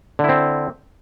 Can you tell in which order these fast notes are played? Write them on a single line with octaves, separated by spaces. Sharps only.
D3 E4 C4